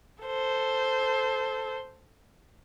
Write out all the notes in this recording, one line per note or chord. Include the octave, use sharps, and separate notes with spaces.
A4 C5